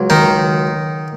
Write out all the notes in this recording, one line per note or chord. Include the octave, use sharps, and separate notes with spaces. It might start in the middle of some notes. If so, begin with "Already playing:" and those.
Already playing: C#2 F#3
D#3 D#4